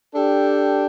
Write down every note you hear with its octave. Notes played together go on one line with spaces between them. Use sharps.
D4 G4 A4 G5